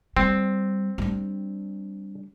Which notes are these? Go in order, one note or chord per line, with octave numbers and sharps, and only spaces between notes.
G3 C4
G3 D4